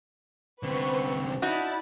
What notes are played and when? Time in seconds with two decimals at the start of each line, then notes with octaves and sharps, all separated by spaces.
0.63 C2 D3 C4 B4 C5 C#6
1.42 D#4 E4 F#4 D5 A5